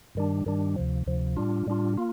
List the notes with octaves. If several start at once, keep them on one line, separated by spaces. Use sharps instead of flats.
G2 D#3 G3 D4
G2 D#3 G3 D4
D2 C3 F3
D2 C3 F3
A2 G3 D4 F4
A2 G3 D4 F4
A#3 F4